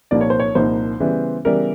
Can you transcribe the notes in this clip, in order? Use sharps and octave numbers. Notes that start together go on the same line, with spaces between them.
C2 A#2 F3 A#3 D#4 D5
C#5
C5
C#5
C2 A#2 F3 A#3 D#4 C5
C#3 E3 G3 B3
C#3 E3 G3 B3 A#4